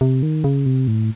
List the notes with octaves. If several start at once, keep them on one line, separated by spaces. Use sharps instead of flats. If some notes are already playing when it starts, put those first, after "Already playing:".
C3
D#3
C#3
C3
A2